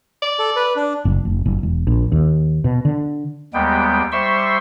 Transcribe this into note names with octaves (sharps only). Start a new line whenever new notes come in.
D5
A4
B4
D4
F#1
F1
F#1
E1
A#1
D#2
B2
D3
D#2 G3 G#3 B3 G5
G3 C5 E5 C6 C#6 E6